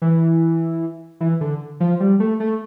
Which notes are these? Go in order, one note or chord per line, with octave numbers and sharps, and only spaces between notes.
E3
E3
D3
F3
G3
A3
A3